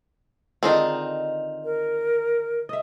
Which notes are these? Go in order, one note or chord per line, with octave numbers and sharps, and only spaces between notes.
D3 D#3 G#3 C4 D#4 F4
A#4
D#5 E5